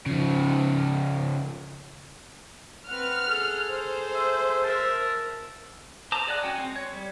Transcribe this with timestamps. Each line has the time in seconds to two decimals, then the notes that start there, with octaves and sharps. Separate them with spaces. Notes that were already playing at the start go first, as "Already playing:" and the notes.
0.06 C#3 F3
2.88 C4 B4 F#5 F6
3.28 G#4 A4
3.71 C5
4.14 E5
4.64 A#4 E5 A5
6.12 C5 A5 A#5 D6
6.27 G#4 D5 D#5 F#5 F#6
6.43 C#4 F#4 G5 G#5
6.55 G#3 C4
6.76 C#5
6.93 G3